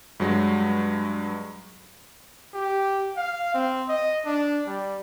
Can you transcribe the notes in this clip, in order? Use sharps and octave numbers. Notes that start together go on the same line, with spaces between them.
G2 F#3 G#3
G4
F5
C4
D#5
D4
G3